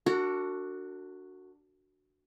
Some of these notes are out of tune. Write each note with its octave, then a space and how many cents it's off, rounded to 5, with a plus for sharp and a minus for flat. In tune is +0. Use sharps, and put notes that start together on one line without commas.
D4 +0 F#4 +0 A#4 -40